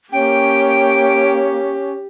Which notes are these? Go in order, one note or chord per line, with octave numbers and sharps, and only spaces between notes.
A#3 C#4 G4 G5